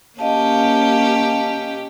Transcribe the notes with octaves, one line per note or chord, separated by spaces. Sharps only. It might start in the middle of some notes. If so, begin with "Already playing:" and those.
A#3 C#4 G4 D#5 F5 A5